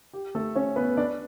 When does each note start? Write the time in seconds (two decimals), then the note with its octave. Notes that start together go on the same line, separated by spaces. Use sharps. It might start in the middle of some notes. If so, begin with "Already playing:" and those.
0.13 G4
0.35 A3 A4
0.55 C#4 C#5
0.76 B3 B4
0.97 D4 D5